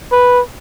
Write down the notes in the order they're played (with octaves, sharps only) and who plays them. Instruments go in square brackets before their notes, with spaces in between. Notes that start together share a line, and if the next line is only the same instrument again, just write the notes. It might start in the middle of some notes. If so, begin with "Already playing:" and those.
[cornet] B4